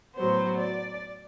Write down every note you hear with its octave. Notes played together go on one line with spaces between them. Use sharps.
A2 F#3 B3 C5
D5